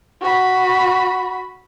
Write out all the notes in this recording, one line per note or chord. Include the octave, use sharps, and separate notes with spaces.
F#4 B5